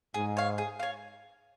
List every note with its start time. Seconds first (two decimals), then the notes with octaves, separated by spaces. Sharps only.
0.14 G#2 G#4
0.37 C#5 F5
0.58 G#4
0.80 C#5 F5